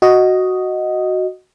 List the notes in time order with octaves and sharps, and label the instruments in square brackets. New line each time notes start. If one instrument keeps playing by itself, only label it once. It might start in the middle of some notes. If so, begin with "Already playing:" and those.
[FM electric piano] F#4 D#5